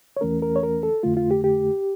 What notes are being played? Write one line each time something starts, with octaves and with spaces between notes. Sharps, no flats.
C#5
E2 E3 A3 C#4 A#4
A#4
C#5
A#4
A4
F2 D3 A3 F4
F4
G4
G4